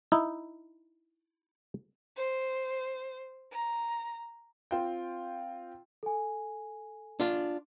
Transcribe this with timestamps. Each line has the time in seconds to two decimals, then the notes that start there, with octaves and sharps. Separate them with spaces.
0.12 D#4 E4
2.17 C5
3.53 A#5
4.71 C4 F4 G5
6.03 A4 G#5
7.20 D4 F4